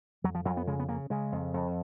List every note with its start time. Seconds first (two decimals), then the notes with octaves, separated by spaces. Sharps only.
0.24 F2 F#3
0.35 F3
0.45 F2 F#3
0.57 B3
0.67 C#3 G#3
0.80 B3
0.89 C#3 A#3
1.10 C#3 G#3
1.32 F2
1.54 F2